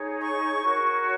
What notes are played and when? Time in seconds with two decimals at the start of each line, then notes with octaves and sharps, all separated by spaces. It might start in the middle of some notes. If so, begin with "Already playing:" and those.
Already playing: D#4 G#4 C#5
0.23 C#6
0.65 F#4 A#4 C#5